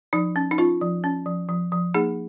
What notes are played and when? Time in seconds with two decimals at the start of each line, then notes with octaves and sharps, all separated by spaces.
0.13 F3 D#4
0.36 C#4
0.51 D#4
0.58 C#4 F4
0.81 F3
1.04 C#4
1.26 F3
1.49 F3
1.72 F3
1.94 A#3 D#4 G#4